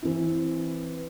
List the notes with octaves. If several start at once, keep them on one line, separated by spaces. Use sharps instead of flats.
E3 C4 E4